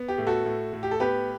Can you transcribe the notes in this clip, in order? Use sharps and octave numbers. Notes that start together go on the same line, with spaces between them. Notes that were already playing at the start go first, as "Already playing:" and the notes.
Already playing: B3
G4
A2
F#4 A4
A2
A2
G4
A4
B3 G4 B4